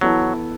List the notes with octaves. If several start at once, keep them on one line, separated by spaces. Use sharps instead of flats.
E3 F#3 B3 E4 A4